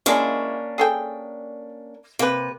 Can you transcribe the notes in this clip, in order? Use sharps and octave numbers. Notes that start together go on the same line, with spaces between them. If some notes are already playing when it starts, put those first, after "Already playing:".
F3 G#3 A#3 C#4 D4 E4
G#4 A4 G5
C3 A#3 B4